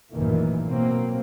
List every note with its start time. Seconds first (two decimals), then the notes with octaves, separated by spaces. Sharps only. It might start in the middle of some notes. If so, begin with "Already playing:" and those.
0.12 A1 F#2 A#2 D#3 E3 A#3
0.68 B2 F#3 A#3 C4